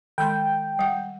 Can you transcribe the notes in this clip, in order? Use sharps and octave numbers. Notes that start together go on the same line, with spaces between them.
D#3 G#3 G5 C6
G3 F#5